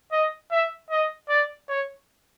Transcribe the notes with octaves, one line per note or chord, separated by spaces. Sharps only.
D#5
E5
D#5
D5
C#5